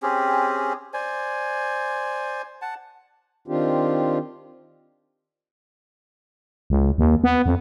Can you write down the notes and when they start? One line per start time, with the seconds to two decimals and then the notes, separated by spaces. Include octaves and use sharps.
0.03 C4 C#4 G4 G#4
0.94 C5 D5 G#5
2.62 F#5 A5
3.48 D#3 C4 D4 F4 G4
6.70 C#2
6.98 D#2
7.24 B3
7.46 F2